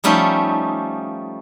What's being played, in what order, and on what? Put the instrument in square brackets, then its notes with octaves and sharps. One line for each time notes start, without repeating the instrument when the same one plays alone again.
[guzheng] F3 G3 A3 C#4 D#4